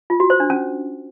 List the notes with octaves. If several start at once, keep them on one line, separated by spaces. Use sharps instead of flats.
F4
F#4
C5
D4
C#4